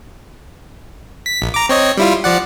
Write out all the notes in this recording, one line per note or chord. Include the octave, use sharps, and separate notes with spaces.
B6
A#1
A#5 D6
C4 C#5 D#5
G3 E4 F4
F3 D5 F#5